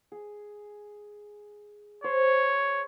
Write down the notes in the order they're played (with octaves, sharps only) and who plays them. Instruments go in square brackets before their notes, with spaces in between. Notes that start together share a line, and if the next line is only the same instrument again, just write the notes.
[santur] G#4
[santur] C5 [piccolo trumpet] C#5